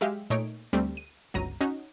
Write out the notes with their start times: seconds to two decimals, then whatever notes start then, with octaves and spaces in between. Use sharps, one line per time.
0.01 F#3 G#3 G4 E5 F5
0.30 A#2 A3 D#4 C#5 D7
0.73 D2 G3 A3 C4
0.97 D#7
1.34 G1 C#2 F#3 A#5 D#7
1.61 C#4 D#4 F#4